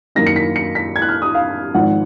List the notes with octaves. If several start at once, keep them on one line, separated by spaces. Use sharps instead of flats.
F#2 D#3 A#3 D#4 A#6
C#7
B6
C#7
B6
G#6
F#6
F6
D#6
F5
G#1 G#2 F3 F#5